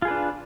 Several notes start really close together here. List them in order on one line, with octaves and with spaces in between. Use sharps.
F4 G#4 B4 D4